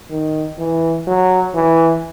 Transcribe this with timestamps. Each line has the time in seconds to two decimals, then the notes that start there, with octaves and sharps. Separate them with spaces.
0.10 D#3
0.59 E3
1.07 F#3
1.55 E3